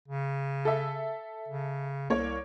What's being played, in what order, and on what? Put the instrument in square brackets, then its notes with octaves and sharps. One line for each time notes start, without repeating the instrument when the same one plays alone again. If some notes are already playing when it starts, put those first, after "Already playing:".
[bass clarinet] C#3
[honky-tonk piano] A4 E5
[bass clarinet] C#3
[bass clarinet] C2 [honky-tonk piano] A#3 C#5